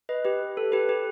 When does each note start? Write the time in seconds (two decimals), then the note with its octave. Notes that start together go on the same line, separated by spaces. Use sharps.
0.09 B4 D#5
0.25 G4 B4
0.57 A4
0.72 G4 B4
0.89 G4 B4